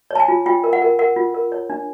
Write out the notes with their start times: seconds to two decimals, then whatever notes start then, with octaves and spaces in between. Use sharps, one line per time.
0.11 C#5 A5
0.20 G#5
0.28 F4
0.46 F4 G5
0.64 A#4
0.73 F#5
0.82 A#4
0.99 A#4 F#5
1.16 F4
1.34 A#4
1.52 C#5
1.70 D4